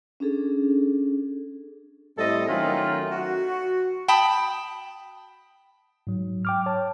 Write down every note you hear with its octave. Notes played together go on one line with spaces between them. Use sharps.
C#4 D4 G#4 A4
A2 G3 C4 A4 D#5 E5
D#3 F#3 A3 C#4 F4 A#4
F#4
G5 A5 B5 D#6
G#2 F#3
G5 D6 F6
C#5 A5